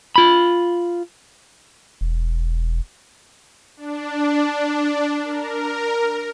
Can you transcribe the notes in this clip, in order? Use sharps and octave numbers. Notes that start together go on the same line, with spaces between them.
F4 B5
E1
D4
A#4